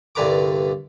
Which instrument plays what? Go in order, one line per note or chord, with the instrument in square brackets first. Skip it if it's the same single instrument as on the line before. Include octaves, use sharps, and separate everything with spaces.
[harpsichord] C2 G2 D3 B4 A#5 D6